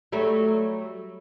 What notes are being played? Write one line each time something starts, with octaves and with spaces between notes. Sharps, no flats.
F#3 G3 A3